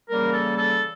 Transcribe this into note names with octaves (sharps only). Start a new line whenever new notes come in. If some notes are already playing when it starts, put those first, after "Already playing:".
C#3 E3 G3 A#3 A#4
A4
A4